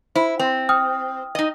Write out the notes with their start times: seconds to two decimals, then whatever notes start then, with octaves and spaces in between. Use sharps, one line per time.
0.15 E4 C5
0.39 C4
0.69 G5 D#6 F6
1.35 D#4 D#5